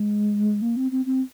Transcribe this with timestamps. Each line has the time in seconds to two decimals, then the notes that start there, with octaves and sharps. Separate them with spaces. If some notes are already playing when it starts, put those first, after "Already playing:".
Already playing: G#3
0.62 A#3
0.77 C4
0.92 C4
1.06 C4